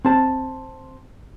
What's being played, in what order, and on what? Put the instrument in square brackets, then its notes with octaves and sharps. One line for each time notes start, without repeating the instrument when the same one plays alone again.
[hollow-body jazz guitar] C4 A5